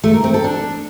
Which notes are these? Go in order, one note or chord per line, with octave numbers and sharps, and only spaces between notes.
A3
A#4
C4
A4
D4